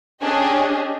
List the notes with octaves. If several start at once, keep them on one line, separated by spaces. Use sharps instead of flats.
C#4 D4 G4 G#4 D#5